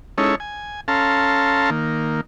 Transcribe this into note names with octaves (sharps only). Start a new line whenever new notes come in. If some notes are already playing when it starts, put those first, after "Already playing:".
G#3 C#4 D#4 E4 A4 C#5
G#5
C#4 A4 F5 A5 A#5 C6
D#3 A#3